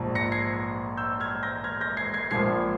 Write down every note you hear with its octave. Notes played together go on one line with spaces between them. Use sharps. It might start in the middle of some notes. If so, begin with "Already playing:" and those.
Already playing: A#1 G#2 F3
A#6 C#7
G#6 C7
E6 G6
F6 G#6
G6 A#6
F6 G#6
G6 A#6
G#6 C7
G#6 C7
A#1 A#2 F3 G#6 C7